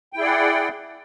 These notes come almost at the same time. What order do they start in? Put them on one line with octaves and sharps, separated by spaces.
G5 E4 G#4 D5 F#5